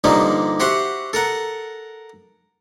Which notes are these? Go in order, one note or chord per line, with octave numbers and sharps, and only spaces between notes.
G2 D3 F3 G3 A#3 D#4
F#4 G4 C5 E5 F#5
A4 A#4 F#5